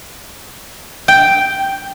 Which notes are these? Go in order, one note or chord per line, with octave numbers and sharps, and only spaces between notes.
G5